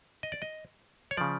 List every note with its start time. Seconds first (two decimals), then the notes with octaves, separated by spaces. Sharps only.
0.23 D#5
0.32 D5
0.42 D#5
1.11 C#5
1.17 C#3 F3 D5